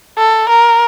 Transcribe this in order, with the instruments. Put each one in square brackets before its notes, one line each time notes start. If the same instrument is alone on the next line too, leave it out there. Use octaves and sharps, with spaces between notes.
[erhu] A4
A#4